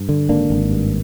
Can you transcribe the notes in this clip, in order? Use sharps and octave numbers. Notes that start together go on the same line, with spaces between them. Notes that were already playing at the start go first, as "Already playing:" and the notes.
Already playing: G2
D3
G#1 A#3 D4
G#1
G2